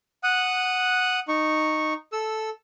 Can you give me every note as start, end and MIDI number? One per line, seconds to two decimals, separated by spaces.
0.23 1.20 78
0.23 1.20 87
0.23 1.20 90
1.28 1.93 63
1.28 1.93 85
2.13 2.50 69
2.13 2.50 88